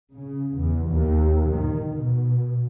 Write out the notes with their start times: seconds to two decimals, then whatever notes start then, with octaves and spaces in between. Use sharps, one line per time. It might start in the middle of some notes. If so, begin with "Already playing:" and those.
0.15 C#3
0.57 E2
0.89 D#2
1.52 D#3
1.92 B2